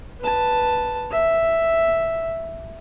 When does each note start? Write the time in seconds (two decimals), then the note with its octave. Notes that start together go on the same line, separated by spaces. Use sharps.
0.20 B4 A5
1.11 E5